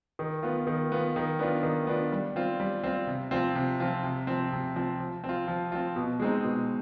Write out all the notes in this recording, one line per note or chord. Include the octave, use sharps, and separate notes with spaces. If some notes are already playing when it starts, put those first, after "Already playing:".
D#3
B3 F4
D#3
B3 F4
D#3
B3 D4 F4
D#3
B3 D4 F4
G3
C4 F4
G3
C4 F4
C3
F3 C4 F4
C3
F3 C4 F4
C3
F3 C4
C3
F3 C4
F3
C4
F4
F3
C4 F4
B2
G#3 C4 D#4
B2